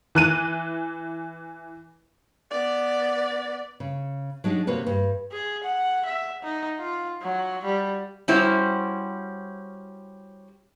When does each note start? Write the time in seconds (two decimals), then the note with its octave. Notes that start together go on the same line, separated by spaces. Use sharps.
0.15 E3 F#6 D#7
2.51 B3 D5
3.80 C#3
4.44 F#3 D4 D#4 G#4
4.67 C3 A#3 F#4 B4 C#5
4.87 G2
5.32 G#4
5.63 F#5
6.05 E5
6.43 D#4
6.79 F4
7.22 F#3
7.64 G3
8.28 G3 C#4 E4 F#4 C5